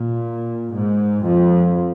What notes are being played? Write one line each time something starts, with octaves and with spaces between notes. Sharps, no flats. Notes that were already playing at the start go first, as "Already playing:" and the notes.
Already playing: A#2
G#2
F2